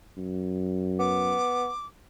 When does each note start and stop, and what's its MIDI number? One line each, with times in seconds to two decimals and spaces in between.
0.17 1.35 42
0.99 1.68 59
0.99 1.86 86